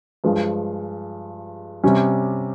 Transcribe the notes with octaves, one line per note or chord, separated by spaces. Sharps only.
G2 F3 G#3
C3 G3 C#4